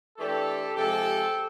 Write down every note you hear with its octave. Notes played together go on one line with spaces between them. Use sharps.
E3 A3 D4 G4 A4
C3 F3 G#3 G4 A4